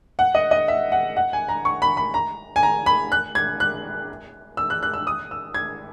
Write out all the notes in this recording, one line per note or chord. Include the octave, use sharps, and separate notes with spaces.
F#5
D#5
D#5
E5
F#5
F#5
G#5
A#5
C#6
B5
B5
A#5
G#5
A#5
B5
F#6
G#6
F#6
E6
F#6
F#6
E6
D#6
E6
G#6